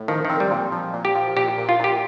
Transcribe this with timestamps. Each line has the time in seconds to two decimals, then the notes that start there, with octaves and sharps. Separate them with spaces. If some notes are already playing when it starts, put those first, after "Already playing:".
Already playing: A2
0.08 D#3 F3
0.25 D#3 C4
0.40 G3
0.51 A#2
0.72 F3
0.94 A#2
1.05 G4
1.15 F3
1.37 A#2 G4
1.58 A#2
1.69 F4
1.80 A#2 G4